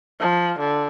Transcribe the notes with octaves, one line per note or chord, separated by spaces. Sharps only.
F3
D3